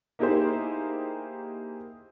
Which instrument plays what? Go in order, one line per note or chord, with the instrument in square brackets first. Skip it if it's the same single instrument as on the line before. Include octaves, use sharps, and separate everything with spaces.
[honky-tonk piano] A#3 D#4 E4 G4 G#4 C5